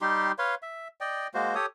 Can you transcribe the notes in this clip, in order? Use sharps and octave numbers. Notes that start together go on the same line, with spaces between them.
G3 D#4 G4 C6
B4 C#5 F5 C6
E5
D5 D#5 G5
G#3 A#3 F#4 C5
G4 A4 C#5 D#6